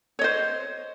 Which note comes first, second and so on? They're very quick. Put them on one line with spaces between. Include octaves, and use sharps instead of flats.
C#5 D#5 C5